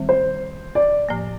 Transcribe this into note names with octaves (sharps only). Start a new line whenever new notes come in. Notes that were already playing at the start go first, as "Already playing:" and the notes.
Already playing: D#3 G3 C4
C5
D5
A2 F3 A#3